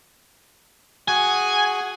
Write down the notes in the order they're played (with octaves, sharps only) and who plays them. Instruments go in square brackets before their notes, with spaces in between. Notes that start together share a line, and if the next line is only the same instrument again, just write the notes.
[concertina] F#4 G#4 F#5 [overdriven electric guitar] G#5